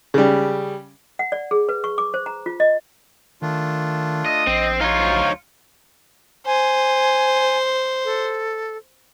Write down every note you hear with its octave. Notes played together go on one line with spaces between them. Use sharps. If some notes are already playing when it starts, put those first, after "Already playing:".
C#3 G3
F#5
D5
G#4
B4
C#6
D6
C5
A#5
F4
D#5
D#3 A3 D4 F4
D#5
A#1 C4
D#4 C#5 F5 C6
D2 F#3 C5
C5 G#5
A4